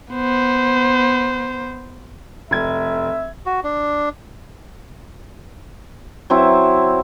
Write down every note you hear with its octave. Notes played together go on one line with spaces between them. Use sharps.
B3 C5
F1 E5 G#6
F#4
D4
F#3 C4 E4